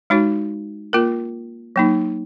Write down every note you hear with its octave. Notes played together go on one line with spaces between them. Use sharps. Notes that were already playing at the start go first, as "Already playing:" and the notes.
G#3 D#4 F#4 C#5
A#3 F4 A#4
F#3 A#3 D#4